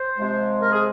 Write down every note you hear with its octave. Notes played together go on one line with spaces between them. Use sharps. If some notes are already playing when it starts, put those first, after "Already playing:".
Already playing: C5
C3 F3 G#3
A#4
G#4